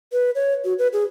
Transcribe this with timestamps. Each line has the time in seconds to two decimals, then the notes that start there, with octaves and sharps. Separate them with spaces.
0.13 B4
0.35 C#5
0.65 F#4
0.79 B4
0.93 G#4